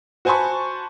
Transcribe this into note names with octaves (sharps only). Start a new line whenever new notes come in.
F#4 C5 G#5 A5 B5 C#6